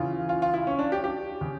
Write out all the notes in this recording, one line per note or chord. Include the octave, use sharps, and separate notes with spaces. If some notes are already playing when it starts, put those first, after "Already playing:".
Already playing: C#3 E3 F4
F4
F4
E4
C#4
D4
G4
G4
C#3